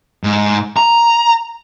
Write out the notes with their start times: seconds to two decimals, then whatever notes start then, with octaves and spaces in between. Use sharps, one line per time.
0.24 G#2
0.77 A#5